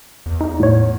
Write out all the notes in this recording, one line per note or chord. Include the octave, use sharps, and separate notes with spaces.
E2
D#4
A2 C#5